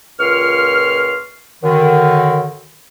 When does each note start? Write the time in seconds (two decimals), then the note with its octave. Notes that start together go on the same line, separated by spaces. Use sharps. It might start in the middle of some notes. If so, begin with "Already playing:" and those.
0.20 C#2 A#2 C6 C#6 F6
1.64 F#2 D3 D#3